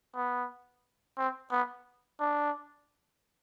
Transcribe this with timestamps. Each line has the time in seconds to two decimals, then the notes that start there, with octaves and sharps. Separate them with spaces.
0.15 B3
1.18 C4
1.51 B3
2.20 D4